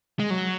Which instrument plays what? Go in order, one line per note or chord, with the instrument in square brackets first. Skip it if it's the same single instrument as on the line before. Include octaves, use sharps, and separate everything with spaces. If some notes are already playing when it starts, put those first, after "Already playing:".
[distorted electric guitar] G#3
F#3